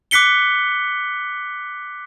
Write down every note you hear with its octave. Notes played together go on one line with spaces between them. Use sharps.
D6 F#6 B6 C#7 G7